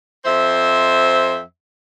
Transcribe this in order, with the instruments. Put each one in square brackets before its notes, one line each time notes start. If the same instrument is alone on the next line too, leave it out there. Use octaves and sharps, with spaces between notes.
[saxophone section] F2 C5 E5